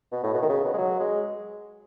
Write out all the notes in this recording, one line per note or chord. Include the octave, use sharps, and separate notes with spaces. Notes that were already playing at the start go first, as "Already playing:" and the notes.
B2
A2
B2
D#3
C#3
B2
G#3
F#3
G#3